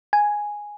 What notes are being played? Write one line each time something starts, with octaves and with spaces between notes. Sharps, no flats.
G#5